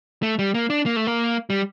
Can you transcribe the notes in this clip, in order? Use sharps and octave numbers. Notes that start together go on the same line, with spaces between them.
A3
G3
A#3
D4
A#3
A3
A#3
G3